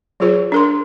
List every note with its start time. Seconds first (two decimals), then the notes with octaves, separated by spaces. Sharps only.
0.20 F#3 F4 G#4 C5
0.52 D4 A#4 C6